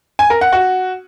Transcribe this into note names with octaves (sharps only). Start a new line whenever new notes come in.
G#5
A#4
F#5
F#4